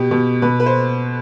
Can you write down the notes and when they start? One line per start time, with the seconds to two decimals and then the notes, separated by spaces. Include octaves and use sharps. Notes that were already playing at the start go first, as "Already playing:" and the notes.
Already playing: B2 G4
0.11 B2
0.42 B2 B4
0.60 B4
0.66 C5